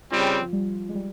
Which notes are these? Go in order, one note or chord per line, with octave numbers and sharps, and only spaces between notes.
C#3 G3 C4 F4
F3
G3
G#3
G3